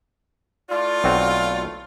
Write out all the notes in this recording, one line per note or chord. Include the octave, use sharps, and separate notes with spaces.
A3 E4 F4 D5
B1 C4 F#4